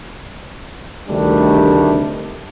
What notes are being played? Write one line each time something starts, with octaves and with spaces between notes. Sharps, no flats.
D2 C3 D#3 G3 A3 D4